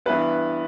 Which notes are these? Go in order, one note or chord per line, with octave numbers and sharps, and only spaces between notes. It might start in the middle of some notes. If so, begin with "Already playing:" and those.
G2 E3 B3 E4 B4